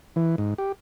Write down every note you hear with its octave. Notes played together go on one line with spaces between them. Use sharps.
E3
G#2
G4